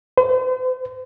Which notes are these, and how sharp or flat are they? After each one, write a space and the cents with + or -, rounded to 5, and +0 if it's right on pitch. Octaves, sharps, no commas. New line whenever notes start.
C5 -40